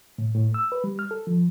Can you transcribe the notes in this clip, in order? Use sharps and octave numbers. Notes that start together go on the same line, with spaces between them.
A2
A2
E6
B4
G3
F6
A4
F3